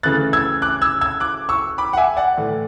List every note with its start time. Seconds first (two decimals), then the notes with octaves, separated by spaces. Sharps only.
0.03 C#3 E3 A3 F#6 A6
0.33 E6 G#6
0.62 D6 F#6
0.82 E6 G#6
1.01 E6 G#6
1.20 D6 F#6
1.49 C#6 E6
1.78 B5 D6
1.93 F#5
1.97 E5 G#5
2.17 D5 F#5
2.37 A2 E3 A3